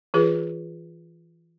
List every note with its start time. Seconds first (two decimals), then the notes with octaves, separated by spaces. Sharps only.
0.14 E3 F4 G#4 B4